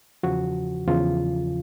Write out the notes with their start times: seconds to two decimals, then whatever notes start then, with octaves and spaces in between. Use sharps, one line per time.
0.23 E2 C#3 F3 F#4
0.88 E2 C#3 F3 F4